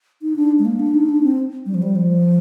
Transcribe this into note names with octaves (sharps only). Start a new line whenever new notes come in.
D#4
D4
G#3
A#3
D4
D#4
D4
C4
G3
F3
G3
F3